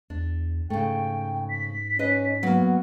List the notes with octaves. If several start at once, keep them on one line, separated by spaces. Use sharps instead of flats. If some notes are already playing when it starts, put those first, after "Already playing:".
E2 D4
G#2 C#3 A3 G5
B6
C#4 B4 D#5
F#3 A#3 B3